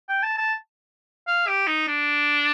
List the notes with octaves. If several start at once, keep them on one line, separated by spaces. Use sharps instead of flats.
G5
A5
A5
F5
G4
D#4
D4